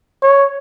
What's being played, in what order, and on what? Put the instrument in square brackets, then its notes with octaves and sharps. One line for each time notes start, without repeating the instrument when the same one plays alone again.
[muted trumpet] C#5